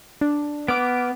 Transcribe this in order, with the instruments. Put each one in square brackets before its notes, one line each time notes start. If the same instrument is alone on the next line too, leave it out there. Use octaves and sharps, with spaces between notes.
[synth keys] D4
[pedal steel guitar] B3 [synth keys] D6 F6 D7